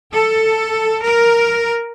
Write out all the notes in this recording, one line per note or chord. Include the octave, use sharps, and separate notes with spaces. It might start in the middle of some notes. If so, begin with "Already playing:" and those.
A4
A#4